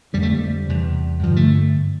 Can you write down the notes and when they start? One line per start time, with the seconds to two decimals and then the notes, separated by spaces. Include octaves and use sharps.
0.13 F2 D3 G3
0.23 A3
0.33 G3
0.68 E2 C3
1.23 G2 D3 F3
1.36 A3